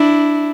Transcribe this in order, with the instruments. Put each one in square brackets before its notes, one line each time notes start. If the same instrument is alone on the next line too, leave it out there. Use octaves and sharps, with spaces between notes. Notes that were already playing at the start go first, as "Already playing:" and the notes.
Already playing: [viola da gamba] D4 E4